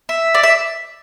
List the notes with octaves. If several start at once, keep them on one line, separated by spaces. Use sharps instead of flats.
E5
D5
E5